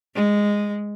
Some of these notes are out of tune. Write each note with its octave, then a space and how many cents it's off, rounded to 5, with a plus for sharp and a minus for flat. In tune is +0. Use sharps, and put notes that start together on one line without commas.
G#3 -10